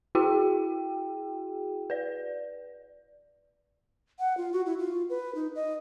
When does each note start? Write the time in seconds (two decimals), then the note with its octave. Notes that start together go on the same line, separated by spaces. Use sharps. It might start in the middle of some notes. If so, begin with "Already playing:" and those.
0.15 E4 F#4 G#4 G5
1.90 B4 D5
4.19 F#5
4.37 F4
4.53 F#4
4.66 E4
4.79 F4
5.09 B4
5.35 D#4
5.55 D#5